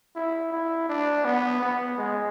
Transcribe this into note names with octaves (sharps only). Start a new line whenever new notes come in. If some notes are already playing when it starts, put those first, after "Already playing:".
E4
E4
D4
B3
B3
G#3